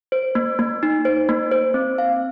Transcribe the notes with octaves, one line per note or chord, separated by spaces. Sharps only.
C5
A#3
A#3
D#4
C5
A#3
C5
C4
F5